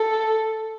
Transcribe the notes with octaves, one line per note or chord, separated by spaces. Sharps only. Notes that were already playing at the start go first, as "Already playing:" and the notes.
Already playing: A4